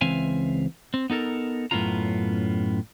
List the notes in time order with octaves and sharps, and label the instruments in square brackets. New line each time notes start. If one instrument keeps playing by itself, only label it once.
[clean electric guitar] C#2 E3 C4 E5 F5 G#5
C4
B3 D#4 A4 A#4
F#2 A2 B3 C#4 F4 A#5